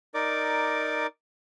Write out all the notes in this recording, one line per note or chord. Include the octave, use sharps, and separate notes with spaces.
D#4 A#4 D5 D6